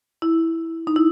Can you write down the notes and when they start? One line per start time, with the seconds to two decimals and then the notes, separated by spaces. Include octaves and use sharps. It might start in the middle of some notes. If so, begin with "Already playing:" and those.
0.22 E4
0.87 D#4
0.96 E4